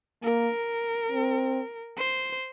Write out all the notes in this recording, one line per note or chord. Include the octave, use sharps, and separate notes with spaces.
A#3 A#4
C4
C5